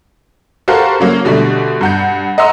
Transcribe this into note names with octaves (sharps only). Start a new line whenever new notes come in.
F#4 G4 A4 A#4 C5 F5
C#3 F#3 A#3 C#4
B2 D3 G3 A3
G2 F#5 G6
D#5 F#5 A#5 C6 E6